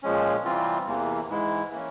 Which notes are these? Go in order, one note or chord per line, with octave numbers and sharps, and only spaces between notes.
A#2 F3 G#3 C#4
C3 E3 G3 C4 F4
E2 C3 E3 A#3
G#2 E3 G#3 E4
E3 A#3 C#4